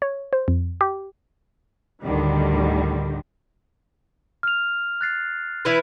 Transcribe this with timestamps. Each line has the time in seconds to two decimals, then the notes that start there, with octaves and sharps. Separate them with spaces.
0.02 C#5
0.33 C5
0.48 F2
0.81 G4
2.03 D2 A2 D3 D#3 G3
4.43 F6 F7
5.01 F#6 A6 C7
5.65 E3 E4 B4